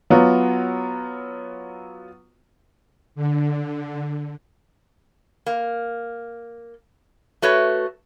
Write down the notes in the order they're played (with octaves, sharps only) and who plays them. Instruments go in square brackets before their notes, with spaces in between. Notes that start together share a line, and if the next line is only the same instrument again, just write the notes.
[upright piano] F#3 B3 F4 F#4
[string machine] D3
[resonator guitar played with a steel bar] A#3
A3 F#4 B4 C#5